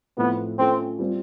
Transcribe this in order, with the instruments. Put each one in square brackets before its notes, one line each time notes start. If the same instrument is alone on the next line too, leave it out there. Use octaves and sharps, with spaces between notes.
[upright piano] A2 F3 A3 C4 F4 [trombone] B3
[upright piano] A3 C#4 F4 A4 [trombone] C4
[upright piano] G3 C4 F4